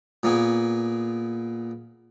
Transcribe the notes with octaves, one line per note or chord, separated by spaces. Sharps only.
A#2 A#3 B3 G#4